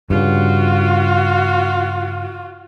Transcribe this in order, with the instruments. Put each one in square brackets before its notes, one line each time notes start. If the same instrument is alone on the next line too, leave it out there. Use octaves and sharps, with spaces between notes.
[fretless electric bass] G2 C#3 [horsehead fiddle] F4 F#4